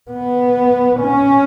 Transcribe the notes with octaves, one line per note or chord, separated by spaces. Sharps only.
B3
C#4